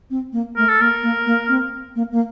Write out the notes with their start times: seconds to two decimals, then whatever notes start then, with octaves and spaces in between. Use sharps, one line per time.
0.10 C4
0.33 A#3
0.57 A3 A#4
0.69 A4
0.80 A#3 A#4
1.03 A#3
1.26 A#3
1.49 C4
1.96 A#3
2.12 A#3